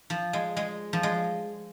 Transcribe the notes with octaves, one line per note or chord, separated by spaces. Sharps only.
F3
G#3
G#3
F3
G#3